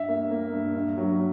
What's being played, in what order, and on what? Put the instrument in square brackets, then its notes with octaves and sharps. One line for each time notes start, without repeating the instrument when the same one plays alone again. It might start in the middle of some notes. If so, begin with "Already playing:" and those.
Already playing: [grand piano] G2 E5
A#3
A#3
G2
G2
F#3